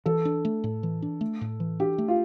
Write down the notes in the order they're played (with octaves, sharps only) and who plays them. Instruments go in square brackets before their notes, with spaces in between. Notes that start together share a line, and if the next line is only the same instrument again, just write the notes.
[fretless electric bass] E3 [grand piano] A4
[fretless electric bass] D4
A3
A2
E3
D4
A3
A2
E3
[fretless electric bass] D4 [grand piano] G4
[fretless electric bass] A3
[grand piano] F4